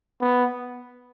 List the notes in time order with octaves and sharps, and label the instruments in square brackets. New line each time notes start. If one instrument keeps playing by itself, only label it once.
[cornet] B3